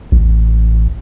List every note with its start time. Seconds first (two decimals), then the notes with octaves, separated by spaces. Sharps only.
0.12 A1